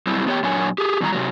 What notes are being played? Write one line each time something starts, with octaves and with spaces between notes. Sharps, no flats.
F#2 G3 C4 E4
B3 G4 C#5 D#5 G5
A#2 F#3 D4 C#5 G#5
G4 G#4
E2 B2 D#3 E3 G3 A#5
C3 F3 F#3